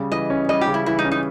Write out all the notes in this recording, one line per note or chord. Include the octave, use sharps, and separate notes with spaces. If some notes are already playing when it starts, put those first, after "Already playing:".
Already playing: C#3 G3
E3 D#5
C#4
G3 D#5
G4
C#3
E4
E3 E4
D#4
C#4
D#4